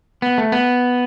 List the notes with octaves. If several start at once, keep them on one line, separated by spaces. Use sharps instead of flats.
B3
A3
B3